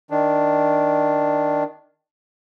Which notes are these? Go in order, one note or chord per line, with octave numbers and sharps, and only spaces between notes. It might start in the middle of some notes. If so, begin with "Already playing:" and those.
D#3 D4